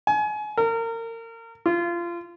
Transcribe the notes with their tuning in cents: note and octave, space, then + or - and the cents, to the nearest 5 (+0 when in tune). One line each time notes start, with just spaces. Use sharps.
G#5 +30
A#4 -30
F4 -25